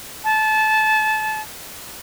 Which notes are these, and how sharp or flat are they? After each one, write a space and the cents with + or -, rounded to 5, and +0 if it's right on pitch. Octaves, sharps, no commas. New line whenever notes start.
A5 -25